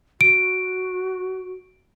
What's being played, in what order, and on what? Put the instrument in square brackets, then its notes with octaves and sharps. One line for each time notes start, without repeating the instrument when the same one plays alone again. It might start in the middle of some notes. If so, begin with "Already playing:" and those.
[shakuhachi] F#4 [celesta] D7